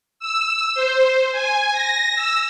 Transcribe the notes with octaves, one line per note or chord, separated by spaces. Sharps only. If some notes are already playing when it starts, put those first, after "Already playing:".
E6
C5
G#5
A#6
E6